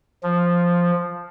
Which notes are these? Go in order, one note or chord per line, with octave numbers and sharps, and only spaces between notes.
F3